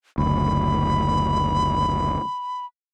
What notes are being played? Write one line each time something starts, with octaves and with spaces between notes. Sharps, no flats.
F#1 D2 B5